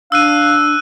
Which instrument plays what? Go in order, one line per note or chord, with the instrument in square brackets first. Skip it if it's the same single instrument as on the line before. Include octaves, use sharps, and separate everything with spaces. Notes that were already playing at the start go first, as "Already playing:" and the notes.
[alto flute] D4 [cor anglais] F5 [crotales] E6 F#6 D#7